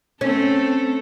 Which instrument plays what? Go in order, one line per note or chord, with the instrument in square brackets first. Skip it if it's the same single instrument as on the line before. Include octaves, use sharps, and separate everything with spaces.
[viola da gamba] A3 C4 A4 [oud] C#4